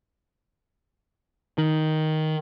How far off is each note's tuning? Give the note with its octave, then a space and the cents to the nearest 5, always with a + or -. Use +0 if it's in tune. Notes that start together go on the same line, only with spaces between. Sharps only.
D#3 +5